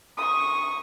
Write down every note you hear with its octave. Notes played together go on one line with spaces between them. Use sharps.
C#6 D#6